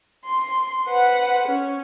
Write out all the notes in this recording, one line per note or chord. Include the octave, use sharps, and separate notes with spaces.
C6
B4 C5 F#5
C#4